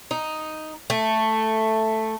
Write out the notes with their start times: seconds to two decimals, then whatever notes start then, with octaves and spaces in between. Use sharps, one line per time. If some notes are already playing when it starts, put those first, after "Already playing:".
0.11 D#4
0.90 A3